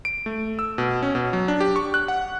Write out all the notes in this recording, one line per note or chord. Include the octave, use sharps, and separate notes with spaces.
D7
A3
E6
B2
C#4
B2
F#3
D4
G4
C#6
F#6
F#5